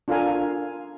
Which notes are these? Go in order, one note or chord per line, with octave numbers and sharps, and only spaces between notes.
D4 F4 A4 A#4 F5 G#5